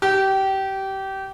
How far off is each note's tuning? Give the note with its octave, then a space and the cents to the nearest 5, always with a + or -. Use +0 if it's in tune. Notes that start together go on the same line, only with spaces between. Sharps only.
G4 -25